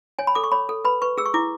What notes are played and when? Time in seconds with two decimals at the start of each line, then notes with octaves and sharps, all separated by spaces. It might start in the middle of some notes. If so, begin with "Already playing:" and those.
0.19 C#5 G#5
0.27 B5
0.35 A4 D6
0.44 C#6
0.52 C#5 B5
0.69 A4
0.85 B4 B5
1.02 B4 C#6
1.18 G#4 E6
1.25 C#6
1.34 E4 D6